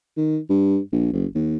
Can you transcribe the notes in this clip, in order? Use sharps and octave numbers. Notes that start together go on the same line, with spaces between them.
D#3
G2
A#1
F#1
D#2